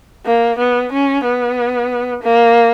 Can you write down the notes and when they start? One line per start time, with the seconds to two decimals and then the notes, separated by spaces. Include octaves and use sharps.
0.26 A#3
0.59 B3
0.92 C#4
1.24 B3
2.23 A#3